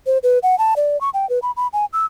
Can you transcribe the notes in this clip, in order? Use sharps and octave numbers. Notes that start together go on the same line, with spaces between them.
C5
B4
F#5
A5
D5
C#6
G5
B4
B5
B5
G#5
E6